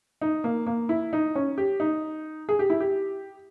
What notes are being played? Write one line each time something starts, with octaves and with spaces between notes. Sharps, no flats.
D#4
A#3
A#3
E4
D#4
C#4
G4
D#4
G#4
G4
E4
G4